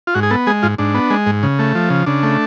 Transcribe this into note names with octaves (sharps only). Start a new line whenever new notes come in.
F4
G#2 F#4
G#4
B3 A4
G#3 G#4
G#2 F4
G#2 D4
B3
G#3
G#2
C#3
A3
F3
C#3
C#3 D4
A3